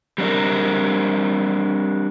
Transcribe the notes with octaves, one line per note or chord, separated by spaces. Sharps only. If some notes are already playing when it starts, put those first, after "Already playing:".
G3 C4 D4 A#4